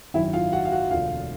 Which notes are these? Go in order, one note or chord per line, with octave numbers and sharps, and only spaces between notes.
G#1 F#2 D#3 F#3 E4 E5
F4 F5
F#4 F#5
F5
F#4 F#5
E1 D2 D3 F4 F5